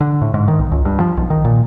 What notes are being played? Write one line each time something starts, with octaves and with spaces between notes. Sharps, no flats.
D3
A2
G#2
D#3
B1
C#2
G2
F3
B1
D#3
A#2